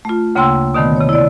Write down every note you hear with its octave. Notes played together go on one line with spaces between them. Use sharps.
A3 F4
D2 C#3 A#3 G5 C6 E6
B2 D3 D#3 A3 B3
C3 C#5
E4 D5